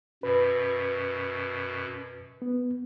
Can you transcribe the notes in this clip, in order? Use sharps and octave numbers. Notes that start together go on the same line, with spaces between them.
F#2 B2 B4
B3